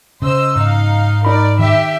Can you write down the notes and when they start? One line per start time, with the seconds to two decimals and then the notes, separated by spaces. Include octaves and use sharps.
0.22 C#3 C5 D#5 E6
0.56 G#2 D#4 F5
1.25 D#4 A#4 D5 B5
1.59 D#3 G4 E5